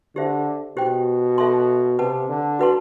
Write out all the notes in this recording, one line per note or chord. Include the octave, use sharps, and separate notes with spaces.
D3 G4 C5 E5
B2 G4 C5 G5
A4 E5 A5 C6
C3 B4 F#5 A5
D3
F#4 B4 F#5 A5 C6